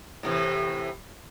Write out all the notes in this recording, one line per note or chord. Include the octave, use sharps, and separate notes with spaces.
A2 C3 E3